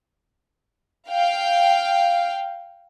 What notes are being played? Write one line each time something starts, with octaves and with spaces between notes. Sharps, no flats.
F5 G5